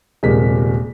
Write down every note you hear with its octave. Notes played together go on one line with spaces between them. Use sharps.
D#1 C3 G#3 A#4 B6